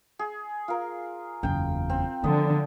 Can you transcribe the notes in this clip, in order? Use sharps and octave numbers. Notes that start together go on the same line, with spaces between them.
G#4
F4 A#4
F#1 E2 G5
C4
D3 F3 B3 D#5